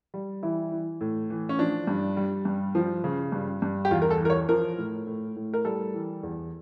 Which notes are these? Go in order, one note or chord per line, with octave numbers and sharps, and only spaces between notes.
G3
E3 E4
E3
A2
E3
C#4
F3 D4
G2
G3
G2
F3
C#3
G2
G2
G4
E2 F4
A#4
A4
E3 A#4
C#5
F3 A#4
A2
A2
A2
A#4
G3 A4
E3
E2